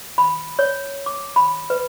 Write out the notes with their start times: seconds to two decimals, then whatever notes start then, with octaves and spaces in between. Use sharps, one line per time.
0.18 B5
0.59 C#5
1.06 D6
1.36 B5
1.70 B4